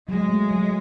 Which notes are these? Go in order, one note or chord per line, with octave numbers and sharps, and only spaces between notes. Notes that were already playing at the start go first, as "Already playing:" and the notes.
F#3 G#3
A3
F#3